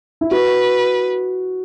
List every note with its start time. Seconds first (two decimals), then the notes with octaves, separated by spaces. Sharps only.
0.21 E4
0.31 F#4 B4